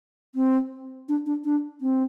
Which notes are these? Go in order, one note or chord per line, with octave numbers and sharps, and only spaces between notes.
C4
D4
D4
D4
C4